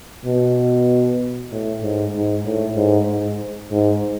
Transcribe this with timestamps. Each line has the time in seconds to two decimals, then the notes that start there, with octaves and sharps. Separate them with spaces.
0.25 B2
1.51 A2
1.82 G#2
2.14 G#2
2.45 A2
2.76 G#2
3.09 G#2
3.71 G#2